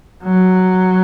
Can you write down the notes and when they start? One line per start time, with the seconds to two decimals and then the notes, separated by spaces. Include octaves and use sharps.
0.24 F#3